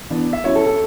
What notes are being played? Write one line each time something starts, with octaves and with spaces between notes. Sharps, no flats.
E3 B3 D4
E5
F#3 C#4 E4 C#5
A4
A4